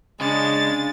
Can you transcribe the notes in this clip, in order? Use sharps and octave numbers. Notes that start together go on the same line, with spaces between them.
C#3 G#3 D4 A6